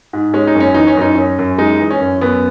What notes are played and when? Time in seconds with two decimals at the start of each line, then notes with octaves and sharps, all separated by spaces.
0.13 G#2
0.34 G#3 C#4
0.47 D#4
0.55 F#2 C#4
0.74 E3 D#4
0.87 C#4
0.97 F#2 D#4
1.15 F#2 C#4
1.39 F#2
1.58 G#3 D#4
1.80 E3
1.90 C#4
2.00 F#2
2.21 F#2 B3